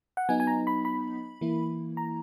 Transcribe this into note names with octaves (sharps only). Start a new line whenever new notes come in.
F#5
F#3 B3 D#4 G#5
G#5
A#5
B5
B5
E3 A#3 E4
A#5